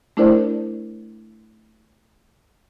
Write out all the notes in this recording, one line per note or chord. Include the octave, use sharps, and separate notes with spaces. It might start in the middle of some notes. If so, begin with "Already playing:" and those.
A3 D4 E4 A#4 C5 D5